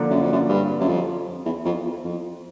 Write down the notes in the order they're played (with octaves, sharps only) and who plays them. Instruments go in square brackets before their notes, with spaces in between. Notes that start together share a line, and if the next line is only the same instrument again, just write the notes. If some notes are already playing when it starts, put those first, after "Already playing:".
Already playing: [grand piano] D3 F3 A#3 D4
[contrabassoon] F#2
F2
F#2
G2
F#2
F2
E2
F2
E2
F2